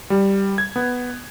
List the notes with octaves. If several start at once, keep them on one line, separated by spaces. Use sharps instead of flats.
G3
G#6
B3